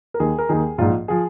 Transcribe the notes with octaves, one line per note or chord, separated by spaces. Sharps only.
A#4
D#2 D#3 G#4
A#4
D#2 D#3 G#4
A#1 G#2 F3 F4
F3 G#4